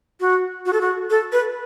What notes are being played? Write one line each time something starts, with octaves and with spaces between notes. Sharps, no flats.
F#4
F#4
A4
F#4
A4
B4